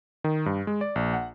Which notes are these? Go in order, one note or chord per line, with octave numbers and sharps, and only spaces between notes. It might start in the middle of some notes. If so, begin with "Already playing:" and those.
D#3
G2
G#3
D5
A#1
F#5